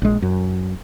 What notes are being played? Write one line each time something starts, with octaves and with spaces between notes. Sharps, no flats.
A#1 G#3
F#2